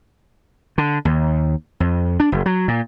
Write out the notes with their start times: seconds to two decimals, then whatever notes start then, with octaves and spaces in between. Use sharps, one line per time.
0.78 D3
1.05 D#2
1.80 F2
2.20 D4
2.32 F#1
2.46 F#3
2.68 A#2